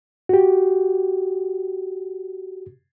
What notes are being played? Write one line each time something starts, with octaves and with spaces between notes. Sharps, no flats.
F#4 G4